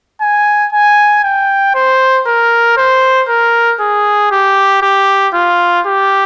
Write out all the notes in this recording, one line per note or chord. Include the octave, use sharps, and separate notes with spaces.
G#5
G#5
G5
C5
A#4
C5
A#4
G#4
G4
G4
F4
G4